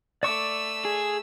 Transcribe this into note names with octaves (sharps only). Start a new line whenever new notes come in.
A3 D5 C#6 D6 E6
G#4